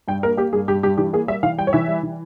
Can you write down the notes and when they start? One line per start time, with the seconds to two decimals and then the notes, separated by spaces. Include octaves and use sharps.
0.08 G2 G5
0.23 A#3 A#4
0.37 A#3 G4
0.53 G2 G#4
0.68 G2 G4
0.83 G2 G4
0.97 E3 G4
1.13 A#3 G#4
1.28 G3 E5
1.43 E3 F5
1.58 G3 G5
1.67 C#5
1.73 E3 E5
1.88 G3
2.03 E3